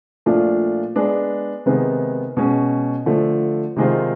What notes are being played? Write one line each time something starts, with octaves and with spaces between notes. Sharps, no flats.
A#2 F3 A3 D4 F4
G#3 B3 D4
C3 D#3 G#3 B3
B2 G#3 C#4
D3 F3 A3
C3 D#3 G#3 C4 F4